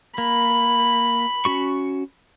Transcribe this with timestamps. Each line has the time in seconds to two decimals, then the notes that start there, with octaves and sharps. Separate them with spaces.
0.18 A#3 B5
1.45 C#4 F#4 C#6